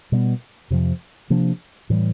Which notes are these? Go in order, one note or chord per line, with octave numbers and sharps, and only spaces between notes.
B2 G3 B3
F2 C3 F3
C3 F3 A#3 D4
A2 E3 G3